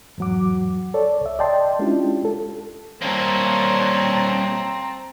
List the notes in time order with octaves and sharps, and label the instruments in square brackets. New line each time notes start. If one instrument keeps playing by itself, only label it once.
[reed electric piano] E2 G#2 F#3 F#5 D6
A4 C#5 D5
C2 E5
D5 D#5 G5 A5 C6
G#3 C#4 D4 E4 F4 G4
A4
[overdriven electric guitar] G3 A#3 [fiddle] C4 [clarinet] C#5 [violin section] A5 A#5